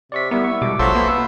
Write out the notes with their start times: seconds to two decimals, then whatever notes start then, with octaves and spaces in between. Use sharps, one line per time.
0.12 C3 D5 C#6 B6
0.31 G3 B3 E4 A#4
0.44 C#6
0.62 B2 G3 G#3 D6
0.79 A#1 F#3 F4 A4 C5 E5
0.95 A#3 B3